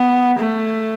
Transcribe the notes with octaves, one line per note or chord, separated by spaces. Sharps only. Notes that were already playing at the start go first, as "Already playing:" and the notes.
Already playing: B3
A3